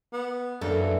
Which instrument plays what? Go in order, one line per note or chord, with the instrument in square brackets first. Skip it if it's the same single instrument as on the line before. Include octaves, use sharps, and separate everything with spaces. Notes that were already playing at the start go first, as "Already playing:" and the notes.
[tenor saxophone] B3
[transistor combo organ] F#2 [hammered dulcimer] D3 E3 [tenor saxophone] A#3 [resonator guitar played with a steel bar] A4